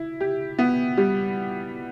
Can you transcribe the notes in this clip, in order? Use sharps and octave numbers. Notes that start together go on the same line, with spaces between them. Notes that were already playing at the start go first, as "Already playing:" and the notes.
Already playing: E4
G4
B3
G3